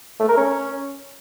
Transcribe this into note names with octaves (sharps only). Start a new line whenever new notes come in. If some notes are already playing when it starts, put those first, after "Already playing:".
A3
A#4
C#4